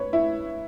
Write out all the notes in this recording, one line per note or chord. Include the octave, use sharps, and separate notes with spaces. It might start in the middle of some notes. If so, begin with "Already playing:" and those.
Already playing: B4 C#5
E4